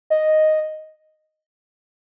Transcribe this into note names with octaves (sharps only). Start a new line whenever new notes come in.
D#5